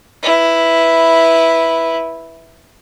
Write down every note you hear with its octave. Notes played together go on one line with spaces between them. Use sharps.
E4 B4